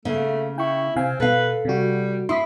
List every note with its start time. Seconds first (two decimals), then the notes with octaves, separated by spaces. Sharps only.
0.05 C#3 A3 A#3
0.58 E4 G5 C#6
0.96 C3 C4 F5 G#5
1.20 B2 A4 B4 F5
1.65 C3 G3 F#4
2.29 E4 C6 D#6 B6